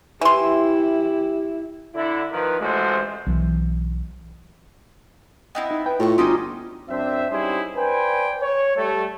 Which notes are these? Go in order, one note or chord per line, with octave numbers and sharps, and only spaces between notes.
E3 E4 G4 C6
D3 E4
D#3 F3 A#4 B4
A1 G#3 A3 F#4 C5
B1 E3
B3 C4 E4 D#5
D#4
B4 G5
A2 F4 A#5 C#6
G1 C#4 D#4 F#4 G4 C6 D#6
F#2 C4 D4 C5 E5
G3 C#4 D#4 E4 G#4 C5
B4 C5 D5 G5 G#5
C#5
G3 A3